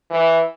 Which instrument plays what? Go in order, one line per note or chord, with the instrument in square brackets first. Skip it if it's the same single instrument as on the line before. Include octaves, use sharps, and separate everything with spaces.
[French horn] E3